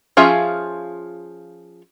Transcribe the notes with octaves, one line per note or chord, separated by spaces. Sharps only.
F3 C#4 F4 G#4 E5